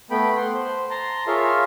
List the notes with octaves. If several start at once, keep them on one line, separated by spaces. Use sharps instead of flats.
A3 B3 G5 B5
F#5 C6
C5
A5 A#5 C6
F4 G#4 A#4 C#5 E5 F5